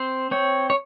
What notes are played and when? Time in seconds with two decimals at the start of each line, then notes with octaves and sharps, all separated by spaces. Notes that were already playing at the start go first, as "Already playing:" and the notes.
Already playing: C4 C5
0.31 C4 C#5
0.70 C#5